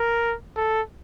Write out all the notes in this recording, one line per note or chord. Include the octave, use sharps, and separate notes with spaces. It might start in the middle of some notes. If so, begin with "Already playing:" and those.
Already playing: A#4
A4